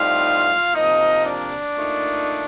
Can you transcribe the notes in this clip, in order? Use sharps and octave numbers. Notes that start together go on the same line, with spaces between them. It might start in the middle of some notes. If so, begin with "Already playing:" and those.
Already playing: A2 G3 C4 D#4 F4 F5
C3 F3 A#3 D#4 D#5
D4 D5
A#2 A3 D#4